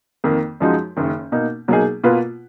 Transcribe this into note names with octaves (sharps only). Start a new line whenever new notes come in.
F2 D#3 A#3
F#2 F3 G#3 D#4 F#4
F#1 F#2 D#3
B2 A#3 D#4
B2 F#3 A#3 D#4 G#4
B2 A#3 F4 B4